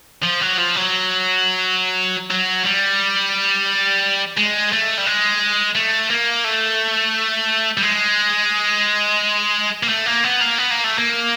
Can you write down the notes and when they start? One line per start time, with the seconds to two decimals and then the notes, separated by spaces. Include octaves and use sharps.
0.23 F3
0.42 F#3
0.58 F3
0.76 F#3
2.30 F#3
2.65 G3
4.37 G#3
4.72 A3
4.98 G3
5.06 G#3
5.75 A3
6.10 A#3
6.44 A3
7.78 G3
7.83 G#3
9.83 A#3
9.89 A3
10.06 A#3
10.24 B3
10.41 A#3
10.58 B3
10.71 A#3
10.84 A3
10.98 A#3